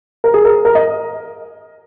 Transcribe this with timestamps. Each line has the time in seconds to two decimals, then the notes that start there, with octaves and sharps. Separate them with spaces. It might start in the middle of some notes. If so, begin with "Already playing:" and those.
0.24 A#4
0.34 G#4
0.45 A#4
0.65 A#4
0.75 D#5